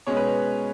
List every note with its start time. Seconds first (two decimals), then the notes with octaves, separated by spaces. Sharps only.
0.07 B2 G#3 C#4 C#5
0.17 B4